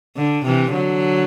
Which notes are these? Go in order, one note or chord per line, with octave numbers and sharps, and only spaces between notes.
D3
C3 E3
D3 F#3